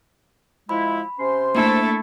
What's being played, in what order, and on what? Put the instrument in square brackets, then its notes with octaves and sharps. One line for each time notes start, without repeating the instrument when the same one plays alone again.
[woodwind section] F3 G#3 E4 [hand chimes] B5
[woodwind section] C3 C#4 C6 [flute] C5
[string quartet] A3 E4 A4 [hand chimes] A#3 D4